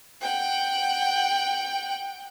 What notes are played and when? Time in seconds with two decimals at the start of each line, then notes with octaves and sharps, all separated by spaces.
0.21 F#5 G5